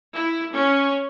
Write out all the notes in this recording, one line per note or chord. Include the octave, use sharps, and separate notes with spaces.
E4
C#4